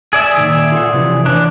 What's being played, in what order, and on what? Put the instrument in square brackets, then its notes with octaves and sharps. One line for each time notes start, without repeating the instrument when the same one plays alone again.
[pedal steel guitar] G#4 D5 E5
[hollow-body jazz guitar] A#2 D#3
F4 A4 F#5
C3 E3 F3
[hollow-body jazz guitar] E3 C#5 A5 [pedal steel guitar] D4